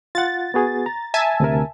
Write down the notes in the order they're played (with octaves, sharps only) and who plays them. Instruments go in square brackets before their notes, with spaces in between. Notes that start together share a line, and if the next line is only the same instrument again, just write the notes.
[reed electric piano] F4 F#5 [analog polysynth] A6
[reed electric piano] B3 F#4 G#4
A#5
[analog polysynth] E5 G#5 A5
[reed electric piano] D2 C3 A#4